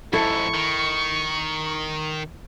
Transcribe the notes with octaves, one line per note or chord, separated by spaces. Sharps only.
F2 G#2 E4 A4 C#6
D#3